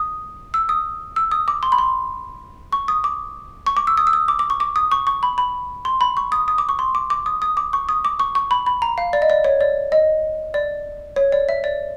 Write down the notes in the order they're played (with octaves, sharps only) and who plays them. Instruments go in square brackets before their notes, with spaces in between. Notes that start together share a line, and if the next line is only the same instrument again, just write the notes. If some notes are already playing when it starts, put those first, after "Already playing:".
Already playing: [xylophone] D#6
E6
D#6
E6
D#6
D6
C6
B5
C6
C#6
D#6
D6
C#6
D6
E6
D#6
E6
D#6
D6
D6
C#6
D6
D#6
C#6
C#6
B5
B5
C6
B5
C#6
D#6
D#6
D6
C#6
C6
D6
D6
D#6
D#6
D6
C#6
D#6
D6
C#6
C#6
B5
B5
A#5
F5
D5
D#5
D5
C#5
D5
D#5
D5
C#5
D5
E5
D5